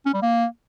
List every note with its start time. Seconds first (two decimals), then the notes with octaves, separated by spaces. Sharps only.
0.06 C#4
0.14 G3
0.22 A#3